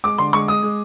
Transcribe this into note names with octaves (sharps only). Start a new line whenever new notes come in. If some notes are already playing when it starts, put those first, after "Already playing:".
G#3 D6
D3 C6
G#3 C#6
G#3 D#6
G#3